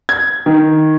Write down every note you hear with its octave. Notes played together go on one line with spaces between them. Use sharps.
G#6
D#3